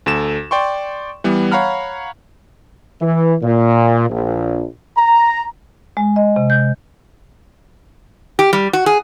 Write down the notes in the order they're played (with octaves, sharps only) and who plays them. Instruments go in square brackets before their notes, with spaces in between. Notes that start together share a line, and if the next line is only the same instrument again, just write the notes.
[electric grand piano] D2 A4 E7
D5 G5 C6 C#6
E3 G3 B3
C#5 F5 F#5 A#5 B5 F6
[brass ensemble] E3
A#2
A#1
A#5
[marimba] G#3
D#5
C3
G6
[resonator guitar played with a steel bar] G4
G3
F#4
G#4